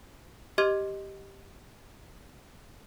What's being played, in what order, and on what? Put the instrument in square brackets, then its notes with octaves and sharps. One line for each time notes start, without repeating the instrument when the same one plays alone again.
[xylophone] G4 D#5 C6 D6 F6 G#6